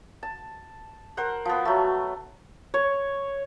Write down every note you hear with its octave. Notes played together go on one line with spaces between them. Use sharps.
A5
A#4 C5 F#5
F3 B3
F#3 A3
C#5